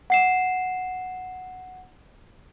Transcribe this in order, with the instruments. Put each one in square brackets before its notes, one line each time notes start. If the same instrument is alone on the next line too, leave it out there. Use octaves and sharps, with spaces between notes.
[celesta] F#5 C7 E7